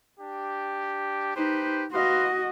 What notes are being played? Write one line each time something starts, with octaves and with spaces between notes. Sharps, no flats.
D4 G4
D#4 G4 B4 C5
F#4 B4 D#5 F5 C6